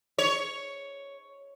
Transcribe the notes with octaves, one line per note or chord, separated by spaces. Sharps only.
C#5